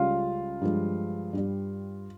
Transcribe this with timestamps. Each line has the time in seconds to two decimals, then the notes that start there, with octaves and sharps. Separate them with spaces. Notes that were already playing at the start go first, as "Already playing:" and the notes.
Already playing: C#2 C#3 G3 F4 F5
0.61 G2 F3 G#3
1.33 G2 G3